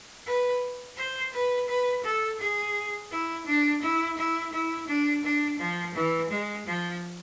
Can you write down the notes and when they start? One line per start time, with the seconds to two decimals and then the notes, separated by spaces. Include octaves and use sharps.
0.26 B4
0.97 C5
1.33 B4
1.68 B4
2.04 A4
2.40 G#4
3.11 E4
3.46 D4
3.82 E4
4.17 E4
4.53 E4
4.88 D4
5.23 D4
5.59 F3
5.95 E3
6.30 G#3
6.67 F3